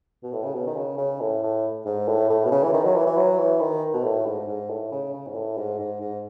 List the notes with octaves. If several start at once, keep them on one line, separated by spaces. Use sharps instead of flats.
B2
A2
C#3
B2
D#3
C#3
C#3
A2
A2
G#2
A2
A2
B2
C#3
E3
D#3
F#3
E3
E3
F#3
E3
D#3
B2
A2
G#2
G#2
A2
C#3
C#3
G#2
A2
G#2
G#2
G#2